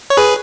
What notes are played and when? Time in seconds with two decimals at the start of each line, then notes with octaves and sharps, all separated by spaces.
0.10 C#5
0.17 G#4 B4